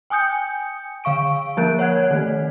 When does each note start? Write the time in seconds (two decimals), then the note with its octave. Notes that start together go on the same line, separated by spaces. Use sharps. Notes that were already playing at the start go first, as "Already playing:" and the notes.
0.10 G5 G#5 D#6 G6 C#7
1.04 D3 F5 C#6 D7
1.57 F3 A#3 A#4 F#6 G6 D7
1.79 C#5 F#5 F#6 G#6
2.11 D#3 A3